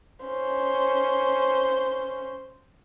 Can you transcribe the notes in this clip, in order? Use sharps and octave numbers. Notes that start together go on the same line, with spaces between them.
C#4 C5